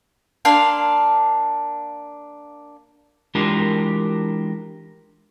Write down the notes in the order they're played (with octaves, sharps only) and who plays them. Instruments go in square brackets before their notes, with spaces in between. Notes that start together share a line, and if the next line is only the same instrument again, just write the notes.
[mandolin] A#3 D4 F5 C6
[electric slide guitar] E3 G#3 D4 F4 G4 A#4